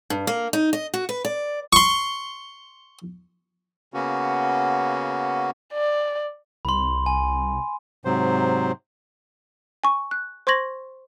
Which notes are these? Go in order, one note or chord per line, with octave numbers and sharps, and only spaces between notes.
G2
A#3
D#4
D#5
F#4
B4
D5
C6 C#6
C#3 A#3 B3 C#4 F#4
D5
C2 B5 C6
G#5
G#2 C3 F#3 C5
G#5 C#6
F#6
C5 C6 C#6 G#6 A#6 F#7